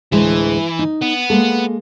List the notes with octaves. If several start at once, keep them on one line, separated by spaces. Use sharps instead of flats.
D2 A2 E3 G#3
D#4
B3
G#3 A#3 A4